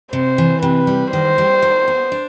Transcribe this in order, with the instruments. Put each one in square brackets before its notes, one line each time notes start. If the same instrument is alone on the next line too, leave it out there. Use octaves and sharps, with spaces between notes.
[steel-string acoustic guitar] C3 [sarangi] C5
[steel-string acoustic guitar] E3
[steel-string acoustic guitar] C3 [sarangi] B4
[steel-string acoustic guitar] G3
[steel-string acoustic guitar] D#3 [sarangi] C5
[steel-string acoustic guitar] G3
D#3
B3
D4